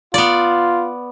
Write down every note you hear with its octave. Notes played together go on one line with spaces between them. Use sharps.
B3 F4 D5